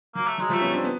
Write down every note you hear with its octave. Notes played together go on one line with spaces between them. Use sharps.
F#3 A#3
A3
F#3 G#3
F3 G3 A3
B3 C#4
C4 D4
B3